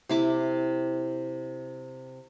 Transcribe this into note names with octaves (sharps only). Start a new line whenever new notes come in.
C3 E4 D6